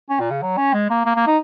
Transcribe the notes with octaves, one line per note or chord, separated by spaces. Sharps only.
C#4
A#2
C#3
F#3
C#4
G#3
A#3
A#3
A#3
D#4